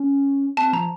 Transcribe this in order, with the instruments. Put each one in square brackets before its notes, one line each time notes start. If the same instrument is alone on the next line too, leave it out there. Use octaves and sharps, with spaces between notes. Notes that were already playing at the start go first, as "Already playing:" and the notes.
Already playing: [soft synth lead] C#4
[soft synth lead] C4 [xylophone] A5
[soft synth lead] F3 [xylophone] A#5